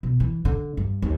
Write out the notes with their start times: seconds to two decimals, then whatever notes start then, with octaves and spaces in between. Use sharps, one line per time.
0.03 B2
0.20 E3
0.45 D3
0.77 G2
1.02 D#2